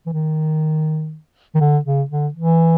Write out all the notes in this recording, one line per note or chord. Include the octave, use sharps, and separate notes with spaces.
E3
D#3
D#3
D3
C#3
D3
E3